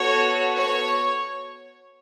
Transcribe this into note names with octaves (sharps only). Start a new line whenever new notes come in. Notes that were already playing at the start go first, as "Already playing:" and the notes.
Already playing: B3 F#4 A4 C#5
C#5